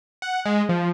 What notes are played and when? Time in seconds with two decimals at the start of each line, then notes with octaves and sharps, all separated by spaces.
0.22 F#5
0.45 G#3
0.69 F3